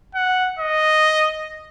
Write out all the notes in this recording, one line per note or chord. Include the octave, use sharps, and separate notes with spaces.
F#5
D#5